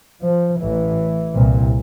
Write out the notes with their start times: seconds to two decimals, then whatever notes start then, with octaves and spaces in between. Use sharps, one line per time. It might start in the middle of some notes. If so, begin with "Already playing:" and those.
0.24 F3
0.61 A1 A2 E3
1.34 C2 A#2